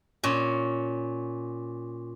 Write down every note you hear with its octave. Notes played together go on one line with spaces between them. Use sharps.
A#2 C#4